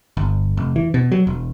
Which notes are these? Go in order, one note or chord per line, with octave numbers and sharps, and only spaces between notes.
G1
F1
E3
B2
F#3
E1